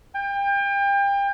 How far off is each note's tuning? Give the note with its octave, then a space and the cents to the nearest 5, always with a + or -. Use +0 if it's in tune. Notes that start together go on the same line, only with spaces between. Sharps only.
G5 +30